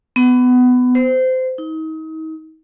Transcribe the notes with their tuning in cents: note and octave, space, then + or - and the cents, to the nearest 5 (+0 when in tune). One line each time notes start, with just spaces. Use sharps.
B3 +20
C5 -20
D#4 +35